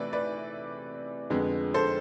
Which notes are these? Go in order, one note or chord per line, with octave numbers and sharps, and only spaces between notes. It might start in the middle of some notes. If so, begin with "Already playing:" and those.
Already playing: C3 E3 A3 B4 D5
B4 D5
F2 D3 G#3 B3
A4 C5